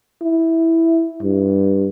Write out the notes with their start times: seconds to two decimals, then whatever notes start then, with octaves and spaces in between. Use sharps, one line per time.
0.22 E4
1.22 G2